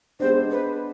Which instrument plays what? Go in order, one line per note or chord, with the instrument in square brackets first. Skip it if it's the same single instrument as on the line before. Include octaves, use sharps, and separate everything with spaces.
[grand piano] G#3 B3 D4 [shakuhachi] C5
[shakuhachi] B4